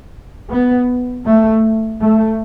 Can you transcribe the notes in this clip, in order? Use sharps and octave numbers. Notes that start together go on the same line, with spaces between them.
B3
A3
A3